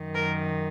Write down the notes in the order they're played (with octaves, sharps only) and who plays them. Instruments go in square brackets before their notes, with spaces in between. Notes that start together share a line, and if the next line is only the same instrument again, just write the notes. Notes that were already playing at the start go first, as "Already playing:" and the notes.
Already playing: [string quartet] F#2 D#3
A#4